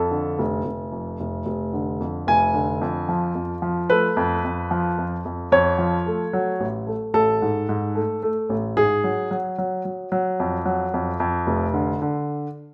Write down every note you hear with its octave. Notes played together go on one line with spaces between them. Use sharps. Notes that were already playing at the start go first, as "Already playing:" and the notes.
Already playing: F2 A4
D3
F1
F1
F2
F1
F1
D3
F2
F1 G#5
D3
F2
F3
F2
F3
A3 B4
F2
F2
F3
F2
F2
F2 C#5
F3
A3
F#3
A1
A3
A1 A4
G#2
G#2
A3
A3
A1
G#2 G#4
F#3
F#3
F#3
F#3
F#3
F2
F#3
F2
F2
F1
D3
D3